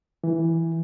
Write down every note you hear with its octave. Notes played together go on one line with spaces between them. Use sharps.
E3